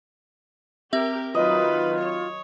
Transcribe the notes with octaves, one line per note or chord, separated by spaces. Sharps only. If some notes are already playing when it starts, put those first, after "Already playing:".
C4 G4 A#4 E5
D#3 F#3 F4 B4 D#5
C#5